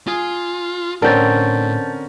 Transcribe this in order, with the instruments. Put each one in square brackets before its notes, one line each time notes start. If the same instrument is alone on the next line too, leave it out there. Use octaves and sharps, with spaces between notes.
[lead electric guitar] F4 [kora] G#4
[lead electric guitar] A2 [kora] D3 C4 [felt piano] C#4 A#4 [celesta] A5 G6 A6